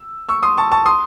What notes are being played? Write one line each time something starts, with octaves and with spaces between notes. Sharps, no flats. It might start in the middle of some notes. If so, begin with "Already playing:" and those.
Already playing: E6
C#6 E6
C6 D#6
A5 C#6
A5 C#6
C6 D#6